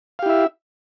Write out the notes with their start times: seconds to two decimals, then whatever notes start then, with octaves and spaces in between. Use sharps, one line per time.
0.19 F5
0.22 G4
0.26 E4
0.29 E5